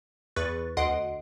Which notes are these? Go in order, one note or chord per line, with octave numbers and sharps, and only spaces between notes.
E2 B4 C#6 F#6 A6
D2 D#5 F#5 C6 C7 D7